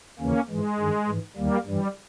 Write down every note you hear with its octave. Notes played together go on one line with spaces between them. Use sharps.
D#2 C#3 E3 A#3 C#4
G#2 E3 G#3
G2 D#3
G#2 E3
D#2 D#3 G3 A#3
G2 E3 G3